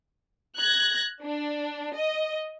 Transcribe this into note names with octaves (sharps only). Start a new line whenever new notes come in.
F#6 G#6 A#6
D4
D#5